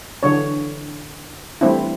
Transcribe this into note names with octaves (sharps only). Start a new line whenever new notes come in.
D3 E3 F#3 D4 C#5
E3 G3 A3 C4 D4 E4